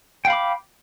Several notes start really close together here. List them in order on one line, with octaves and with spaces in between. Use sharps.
G5 F5 B5 D6